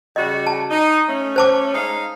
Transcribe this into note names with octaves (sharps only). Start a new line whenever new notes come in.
C#3 G3 F#4 D#5
A5
D#4
A3 C#4
C5 A5 D6
G#3 D#4 F5